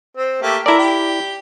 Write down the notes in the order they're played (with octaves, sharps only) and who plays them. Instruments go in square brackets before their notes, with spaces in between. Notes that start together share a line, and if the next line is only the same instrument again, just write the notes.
[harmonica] C4
A3 A#3 G4
[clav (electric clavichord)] E4 D5 [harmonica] A4 A#4
[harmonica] G4